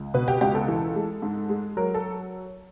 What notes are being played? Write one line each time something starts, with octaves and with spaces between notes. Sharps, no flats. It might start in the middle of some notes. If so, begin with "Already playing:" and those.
Already playing: C#2
B2 B4
G4
C#2 G4
A4
E3
G#3
G#2
G#3
F#3 A#4
A4